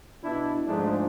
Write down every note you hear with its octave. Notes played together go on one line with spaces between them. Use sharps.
B2 D4 E4
G#2 F3 G#3 A3 D4 D#4